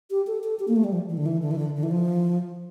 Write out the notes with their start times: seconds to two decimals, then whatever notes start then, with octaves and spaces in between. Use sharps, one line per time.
0.10 G4
0.27 A4
0.44 A4
0.59 G4
0.68 A#3
0.76 A3
0.84 G3
0.92 F3
1.09 E3
1.17 D3
1.26 E3
1.42 D3
1.51 E3
1.58 D3
1.75 D3
1.83 E3
1.91 F3